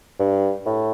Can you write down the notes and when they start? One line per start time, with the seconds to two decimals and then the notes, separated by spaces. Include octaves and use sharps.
0.19 G2
0.66 A2